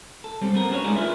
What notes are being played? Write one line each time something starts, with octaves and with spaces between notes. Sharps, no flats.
A4
G3 C4 C#4
A3 B3 C4 A#4
C#4 D4 F#4 C5 C#5
G#3 A3 D#4 G#4 A#4 D5
E4 F4 A#4 B4 E5